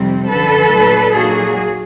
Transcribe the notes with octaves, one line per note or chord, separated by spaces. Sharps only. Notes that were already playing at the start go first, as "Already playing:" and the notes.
Already playing: F2 C3 D#3 G3 C4
F#2 D3 F3 A4 B4
A#2 F#3 A3 D4
A#2 F#3 A#3 D#4 F#4 G#4